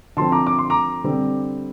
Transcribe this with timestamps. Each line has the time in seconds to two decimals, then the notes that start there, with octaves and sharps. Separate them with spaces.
0.17 D3 F3 C4 A5 C6
0.32 A#5 D6
0.47 D6
0.59 C6
0.70 A#5 D6
1.04 D3 G3 C4